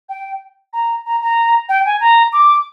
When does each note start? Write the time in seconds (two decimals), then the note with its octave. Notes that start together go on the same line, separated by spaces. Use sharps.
0.09 G5
0.73 A#5
1.05 A#5
1.22 A#5
1.69 G5
1.85 G#5
2.01 A#5
2.33 D6